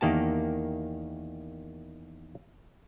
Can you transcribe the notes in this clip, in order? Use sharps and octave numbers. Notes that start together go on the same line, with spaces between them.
E2 D#3 A#3 G4 A5